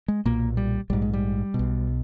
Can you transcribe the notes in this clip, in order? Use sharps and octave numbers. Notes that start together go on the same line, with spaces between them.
G#3
B1 A#2 A#3
G3
A#1 G#2 G3
G#3
G3
B2
B1